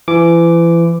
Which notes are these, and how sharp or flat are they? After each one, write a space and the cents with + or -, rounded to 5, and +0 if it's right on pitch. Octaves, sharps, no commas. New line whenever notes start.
E3 +30 D6 -5